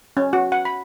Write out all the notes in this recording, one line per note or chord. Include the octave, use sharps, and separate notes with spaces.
C#4
F#4
F#5
B5